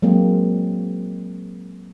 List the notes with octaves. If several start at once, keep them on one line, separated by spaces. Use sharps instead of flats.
F#3 G#3 A#3 C4